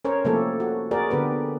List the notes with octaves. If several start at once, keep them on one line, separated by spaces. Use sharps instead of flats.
C#4 A#4 C5 C#5
C3 F3 A3 A#3 G4 A4
F#4
F#4 G#4 A#4 D5
D3 B3 G4 B4